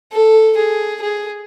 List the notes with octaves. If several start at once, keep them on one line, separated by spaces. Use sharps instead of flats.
A4
G#4
G#4